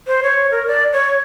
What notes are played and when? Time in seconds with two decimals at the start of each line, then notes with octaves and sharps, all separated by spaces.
0.07 C5
0.23 C#5
0.51 A#4
0.67 D5
0.93 C#5